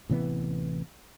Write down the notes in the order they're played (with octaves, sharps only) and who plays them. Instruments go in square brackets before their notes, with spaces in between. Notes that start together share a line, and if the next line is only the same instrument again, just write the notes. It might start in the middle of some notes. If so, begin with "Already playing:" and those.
[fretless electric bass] A1 C3 E3 B3